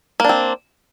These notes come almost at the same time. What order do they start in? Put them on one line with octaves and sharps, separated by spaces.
A#3 D4 C4